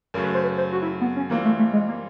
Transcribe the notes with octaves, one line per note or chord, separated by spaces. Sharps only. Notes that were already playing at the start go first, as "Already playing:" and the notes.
F#2 C#3 F#3 A3 A#4
B4
C5
B4
C5
F#4
E4
B3
C#4
E3 G3 A#3 C4 F4
A3
A3
G#3
A#3